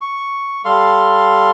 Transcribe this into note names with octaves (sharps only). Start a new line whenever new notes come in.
C#6
G3 A4 F5 C6